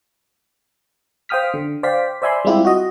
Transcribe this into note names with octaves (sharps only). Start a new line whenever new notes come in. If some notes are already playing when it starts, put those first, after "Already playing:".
C5 F5 G5 D#6 F6 B6
D3
C5 D5 F5 G5 B6
C5 D5 E5 G#5 B5 C6
G3 G#3 C4 E4 F4 G4
F#4 D#5